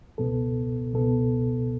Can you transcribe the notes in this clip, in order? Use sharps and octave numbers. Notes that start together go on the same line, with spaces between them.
C#2 B2 B3 A4
C#2 B2 B3 A4